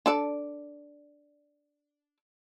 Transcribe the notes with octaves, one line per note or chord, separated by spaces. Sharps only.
D4 A4 D5